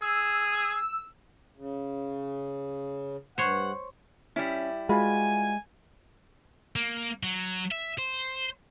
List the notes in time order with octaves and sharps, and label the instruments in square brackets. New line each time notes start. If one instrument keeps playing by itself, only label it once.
[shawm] G#4 [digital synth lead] E6
[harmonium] C#3
[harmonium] G2 F#5 [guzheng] C5 C#5
[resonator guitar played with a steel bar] G3 E4 [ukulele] C#4
[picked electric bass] G#3 [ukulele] F4 F#4 B4 [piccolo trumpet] G#5
[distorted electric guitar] A#3
F#3
E5
C5